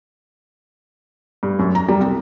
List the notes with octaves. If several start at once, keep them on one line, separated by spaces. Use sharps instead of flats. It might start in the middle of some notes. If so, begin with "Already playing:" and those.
G2
F#2
A#5
G3
C2